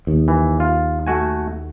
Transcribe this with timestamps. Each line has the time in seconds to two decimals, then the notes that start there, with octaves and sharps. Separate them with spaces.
0.07 D#2
0.28 E3
0.60 F4
1.07 A3 F#4 G#5